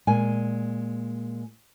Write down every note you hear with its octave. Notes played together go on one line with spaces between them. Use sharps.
A#2 G#3 G#5